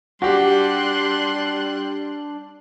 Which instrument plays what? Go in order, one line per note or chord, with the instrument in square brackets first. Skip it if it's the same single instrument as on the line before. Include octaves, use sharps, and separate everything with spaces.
[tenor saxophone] G3 [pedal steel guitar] D4 [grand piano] F#4 G4 [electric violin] C6 F#6